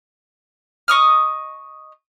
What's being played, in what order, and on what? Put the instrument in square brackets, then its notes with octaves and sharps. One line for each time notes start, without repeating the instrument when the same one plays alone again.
[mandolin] D#5 C#6 D#6 F6